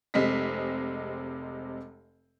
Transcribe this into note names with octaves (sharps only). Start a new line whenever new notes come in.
F1 C3 G#3 C4 D#5 B6